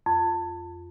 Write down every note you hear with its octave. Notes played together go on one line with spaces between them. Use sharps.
F2